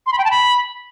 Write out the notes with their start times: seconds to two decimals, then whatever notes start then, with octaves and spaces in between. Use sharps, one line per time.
0.06 C6
0.12 B5
0.18 G5
0.25 A5
0.31 B5